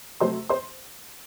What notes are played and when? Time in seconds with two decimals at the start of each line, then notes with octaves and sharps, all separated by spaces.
0.20 C3 F#3 A3 C5 C6
0.50 C5 C6